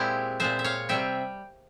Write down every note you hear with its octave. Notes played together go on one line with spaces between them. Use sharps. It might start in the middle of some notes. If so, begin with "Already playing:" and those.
Already playing: A#2 G#3 C4 E4 G4
A#2 G#3 C4 C5 E5
E5
C#5 F5
C3 G3 C4 E5 G5